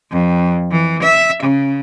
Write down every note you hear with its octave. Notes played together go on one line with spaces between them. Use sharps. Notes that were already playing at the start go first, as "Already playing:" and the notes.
F2
E3
E5
C#3